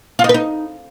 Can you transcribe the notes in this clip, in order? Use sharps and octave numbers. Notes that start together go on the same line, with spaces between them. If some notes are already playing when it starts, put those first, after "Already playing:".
F4
D#4
B4
D#4